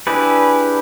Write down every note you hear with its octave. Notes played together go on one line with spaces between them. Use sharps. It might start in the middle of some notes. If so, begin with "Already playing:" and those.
D4 E4 G4 G#4 B4